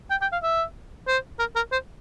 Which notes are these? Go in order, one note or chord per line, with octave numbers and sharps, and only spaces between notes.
G5
G5
F5
E5
C5
A#4
A#4
C5